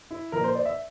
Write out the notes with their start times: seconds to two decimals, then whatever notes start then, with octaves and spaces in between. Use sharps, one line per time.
0.11 E4
0.32 A#2 F3 A#4
0.44 C5
0.55 D5
0.65 E5